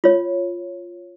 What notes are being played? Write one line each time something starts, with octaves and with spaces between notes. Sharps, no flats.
F4 C#5